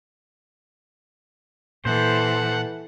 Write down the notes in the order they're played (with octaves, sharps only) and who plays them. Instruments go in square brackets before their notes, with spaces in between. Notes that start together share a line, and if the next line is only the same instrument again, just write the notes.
[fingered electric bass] A#2 [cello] E3 A4 [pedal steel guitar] C5 [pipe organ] F#5